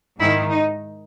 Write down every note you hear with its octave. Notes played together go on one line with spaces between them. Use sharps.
G#2 D#3 E4
D#4